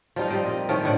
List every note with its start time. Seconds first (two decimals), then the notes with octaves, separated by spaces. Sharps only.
0.16 F3 G3 D#4 F4
0.28 G3 C4 D#5
0.43 A#2 D#5
0.69 D#3 F3 A3 C#4
0.83 A2 D3 F#5